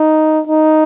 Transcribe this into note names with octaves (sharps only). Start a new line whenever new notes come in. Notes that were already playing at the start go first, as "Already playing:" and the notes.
Already playing: D#4
D#4